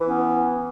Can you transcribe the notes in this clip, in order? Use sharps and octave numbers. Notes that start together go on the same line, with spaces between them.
E3 B3 C#4